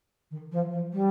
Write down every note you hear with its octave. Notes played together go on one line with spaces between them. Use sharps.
D#3
F3
F3
G3